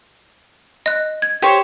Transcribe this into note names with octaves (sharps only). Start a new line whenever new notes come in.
D#5 F#6
G#6
G4 C5 C#5